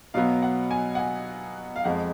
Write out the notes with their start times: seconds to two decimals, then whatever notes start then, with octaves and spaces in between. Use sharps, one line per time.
0.14 B2 F#3 B3 F5
0.42 F#5
0.71 G#5
0.95 F#5
0.99 G#5
1.76 F5
1.84 F2 F3 G#3 F#5